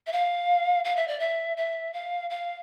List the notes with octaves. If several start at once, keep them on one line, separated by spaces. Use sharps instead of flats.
E5
F5
F5
E5
D5
E5
E5
F5
F5